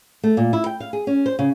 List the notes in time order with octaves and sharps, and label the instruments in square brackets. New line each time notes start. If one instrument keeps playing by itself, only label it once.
[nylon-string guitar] A3
A#2
E4
G5
F5
G#4
C#4
C5
C#3